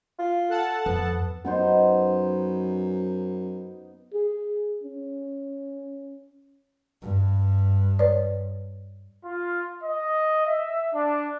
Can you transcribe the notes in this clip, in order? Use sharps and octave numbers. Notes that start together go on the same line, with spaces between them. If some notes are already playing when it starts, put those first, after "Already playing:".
F4
A4 F#5 A5
F2 B3
F#2 B3 D#4 C5
G#4
C#4
G2
B4 C#5 D5
F4
D#5
E5
D4